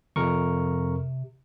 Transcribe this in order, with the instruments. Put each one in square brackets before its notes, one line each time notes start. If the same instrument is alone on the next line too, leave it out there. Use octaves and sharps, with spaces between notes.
[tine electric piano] F2 A#4 C#6 [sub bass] C3